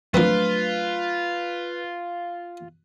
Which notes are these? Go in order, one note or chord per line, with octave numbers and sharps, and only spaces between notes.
F3 F#3 A3 A#3 C4 D4 F4 B4